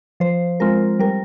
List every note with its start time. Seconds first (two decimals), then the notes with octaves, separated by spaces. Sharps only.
0.20 F3 C5
0.60 G#3 C4 F4 A#4
0.99 G3 A#4